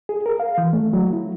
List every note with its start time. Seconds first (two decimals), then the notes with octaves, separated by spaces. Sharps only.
0.09 G#4
0.26 A#4
0.40 F5
0.58 E3
0.73 A3
0.93 F#3
1.13 E4